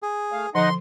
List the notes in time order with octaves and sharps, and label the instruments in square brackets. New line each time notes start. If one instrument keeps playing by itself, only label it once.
[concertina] G#4
[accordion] A3 F5
[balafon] D3 F3 [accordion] D#4 D#5 F#5 [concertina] C6